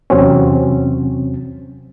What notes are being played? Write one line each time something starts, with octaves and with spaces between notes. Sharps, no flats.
E2 C3 F#3 C4 C#4